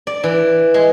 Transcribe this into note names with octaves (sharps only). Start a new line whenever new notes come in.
D5
E3
G#3